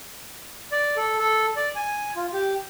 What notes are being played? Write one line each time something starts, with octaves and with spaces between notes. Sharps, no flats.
D5
A4
A4
D5
G#5
F4
G4